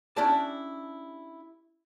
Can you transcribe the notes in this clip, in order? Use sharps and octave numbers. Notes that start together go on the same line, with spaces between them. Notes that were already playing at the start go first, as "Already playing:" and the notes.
C#4 D4 E4 G4 D5 A5